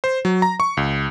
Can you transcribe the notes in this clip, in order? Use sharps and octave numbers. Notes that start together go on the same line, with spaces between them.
C5
F#3
A#5
C#6
C#2